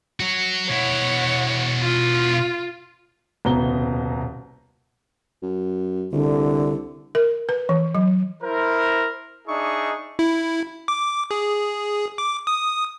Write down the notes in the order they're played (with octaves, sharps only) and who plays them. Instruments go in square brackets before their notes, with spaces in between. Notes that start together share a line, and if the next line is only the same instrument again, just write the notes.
[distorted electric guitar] F#4 C#5
[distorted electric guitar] B2 E4 [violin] C#5 F#5
[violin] F4
[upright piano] D#1 C2 B2 B3 A#5 G7
[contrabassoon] F#2
[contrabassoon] C2 [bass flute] D3
[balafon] A#4
B4
E3
F#3
[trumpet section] E4 A#4 C5
D4 D#4 G#4 E5 C#6 D#6
[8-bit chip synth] E4
D6
G#4
D6
D#6